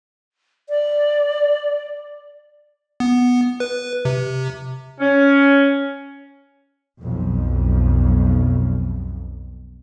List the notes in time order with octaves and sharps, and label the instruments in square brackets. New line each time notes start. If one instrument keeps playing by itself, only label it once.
[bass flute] D5
[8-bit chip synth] B3
B4
C3
[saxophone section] C#4
[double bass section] B1 F2